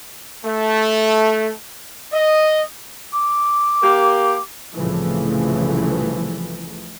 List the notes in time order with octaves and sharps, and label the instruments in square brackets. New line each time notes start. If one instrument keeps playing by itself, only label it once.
[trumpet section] A3
D#5
[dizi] D6
[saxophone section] A#3 G4
[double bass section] C2 A2 C#3 E3 F3 A3